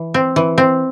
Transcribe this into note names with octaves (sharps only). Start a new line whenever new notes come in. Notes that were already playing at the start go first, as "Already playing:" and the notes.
Already playing: E3
C4
E3
C4